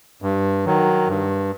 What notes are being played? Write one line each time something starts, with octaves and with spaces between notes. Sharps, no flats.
G2
D#3 F#3
G2